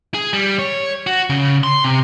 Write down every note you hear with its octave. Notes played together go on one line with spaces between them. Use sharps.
G#4
G3
C#5
F#4
C#3
C6
C3